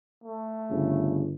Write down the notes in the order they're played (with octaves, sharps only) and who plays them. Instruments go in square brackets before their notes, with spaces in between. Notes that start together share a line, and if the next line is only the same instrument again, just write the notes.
[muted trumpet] A3
[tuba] G1 [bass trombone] C#3